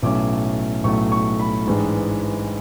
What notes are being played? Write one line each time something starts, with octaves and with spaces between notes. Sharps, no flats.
B1 A2 F#3 A3 C#4 D6
B1 A2 F#3 A3 C#4 C#6
C#6
B5
A1 G#2 E3 G#3 D4